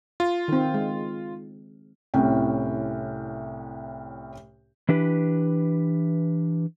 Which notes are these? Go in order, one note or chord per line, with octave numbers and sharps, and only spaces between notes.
F4
D#3 C4
G#3
C2 A2 C#4 G5
E3 D4 G4 B4